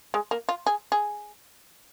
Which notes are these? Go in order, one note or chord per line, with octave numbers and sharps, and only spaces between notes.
G#3
A#3
F4
G#4
G#4